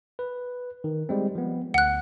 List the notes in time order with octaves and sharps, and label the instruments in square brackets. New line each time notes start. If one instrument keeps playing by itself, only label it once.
[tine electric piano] B4
D#3
G3 G#3 C4
F3 B3
[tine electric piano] D2 [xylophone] F#5 F#6